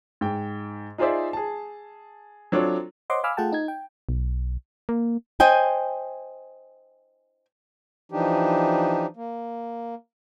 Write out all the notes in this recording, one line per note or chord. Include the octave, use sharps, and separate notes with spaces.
G#2 G5
D#4 F4 G#4 C5 D5 E5
G#4 A5
F#3 C4 D4 F4 A4 C#5
C5 C#5 D#5 F#5 C6 D6
F5 G#5 B5 D6 E6 F6
A3 F4 G#4 F#5 G5 A5
D#4 G#6
G5
B1
A#3
C5 D#5 G5 G#5
E3 F3 D4 D#4 G4
A#3